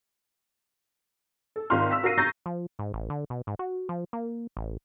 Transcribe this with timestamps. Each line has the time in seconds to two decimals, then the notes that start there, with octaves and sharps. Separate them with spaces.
1.56 A4
1.70 G#1 D#3 F4 C6 F6
1.91 E6 B6
2.03 F#4 A#4 F5 A#6 C7 D#7
2.18 A#5 C#6 E6 G6 A6 A#6
2.46 F3
2.79 G#2
2.94 A1
3.10 D3
3.30 B2
3.47 G#2
3.59 F#4
3.89 F3
4.13 A#3
4.57 A1